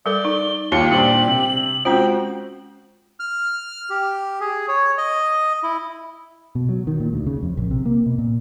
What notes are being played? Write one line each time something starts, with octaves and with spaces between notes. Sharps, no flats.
G3 A4 A#4 D5 G7
D#4
D#2 F4 G4 C#7 G7
A#2 G3 D4 C5 F#7
C3
G#3 C4 C#4 F4 F#4 G5
F6
G4
G#4
C#5
D#5
E4
B2
F#3
D#3
A#2
D2
C#3
F2
A#1
C3
A#3
B2
A#2